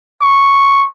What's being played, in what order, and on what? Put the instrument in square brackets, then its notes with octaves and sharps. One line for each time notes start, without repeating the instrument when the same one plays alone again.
[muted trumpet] C#6